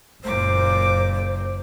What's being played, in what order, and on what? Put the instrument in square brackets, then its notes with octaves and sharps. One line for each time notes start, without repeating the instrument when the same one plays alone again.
[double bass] F#1 [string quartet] A#2 D6 [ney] C5